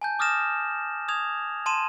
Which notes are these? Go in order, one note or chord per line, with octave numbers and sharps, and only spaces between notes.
G#5 A5 G6
D6 D#6 F6 A6 A#6 E7
D#6 G#6 F7
A5 C6 D#7 E7